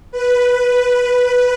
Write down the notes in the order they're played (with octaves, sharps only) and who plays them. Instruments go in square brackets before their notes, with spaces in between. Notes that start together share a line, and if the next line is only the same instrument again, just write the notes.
[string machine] B4